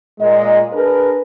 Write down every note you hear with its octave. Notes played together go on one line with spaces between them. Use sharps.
A#2 G#3 D#5
D4 G#4 A#4 B4